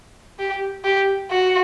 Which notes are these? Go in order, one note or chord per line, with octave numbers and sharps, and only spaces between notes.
G4
G4
F#4